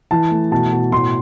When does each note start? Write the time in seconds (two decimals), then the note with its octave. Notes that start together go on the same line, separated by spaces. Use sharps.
0.11 E3 A5
0.31 A3
0.51 B2 A5
0.72 B2
0.92 A2 C6